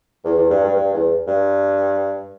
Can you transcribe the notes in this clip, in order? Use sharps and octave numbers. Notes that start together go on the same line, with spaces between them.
E2
E2
G2
G2
G2
E2
G2